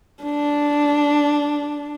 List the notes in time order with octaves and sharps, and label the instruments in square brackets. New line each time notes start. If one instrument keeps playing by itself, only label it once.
[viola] D4